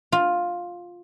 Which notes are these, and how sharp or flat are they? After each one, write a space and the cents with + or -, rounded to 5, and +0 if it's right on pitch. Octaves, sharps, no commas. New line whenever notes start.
F4 +10